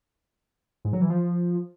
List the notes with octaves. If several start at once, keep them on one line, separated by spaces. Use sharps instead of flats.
G#2
F#3
E3
F3